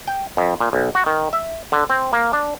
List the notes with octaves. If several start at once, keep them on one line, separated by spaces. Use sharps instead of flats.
G5
F2
A#2
B1
F#4
D#3
E5
D3
C4
A#3
D4